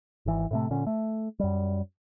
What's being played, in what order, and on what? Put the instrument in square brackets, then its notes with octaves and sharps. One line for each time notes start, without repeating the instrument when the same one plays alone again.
[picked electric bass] G#1 E3
A2 C3 A3
A#2 D3 C#4
A3
F#2 G3